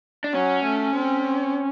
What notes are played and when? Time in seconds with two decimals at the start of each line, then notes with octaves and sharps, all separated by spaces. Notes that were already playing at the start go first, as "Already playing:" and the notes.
0.24 D4
0.34 F#3 C#4
0.65 A3
0.96 C4